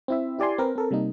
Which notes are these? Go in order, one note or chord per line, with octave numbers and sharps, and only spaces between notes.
C4 E4 E5
E4 G4 D5 G#5 C6
C4 A#4 B4
C4 A4 A#4
C3 G3 A#3 D#4